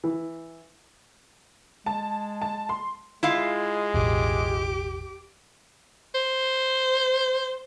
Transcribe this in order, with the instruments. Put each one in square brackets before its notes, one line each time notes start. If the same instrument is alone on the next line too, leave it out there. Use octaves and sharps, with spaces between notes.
[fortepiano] E3
[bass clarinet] G#3 [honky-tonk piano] A5
[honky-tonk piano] A5
C6
[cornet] G#3 [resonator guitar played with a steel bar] E4 F4 F5
[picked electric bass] E1 A1 [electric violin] G4 D6
[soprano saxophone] C5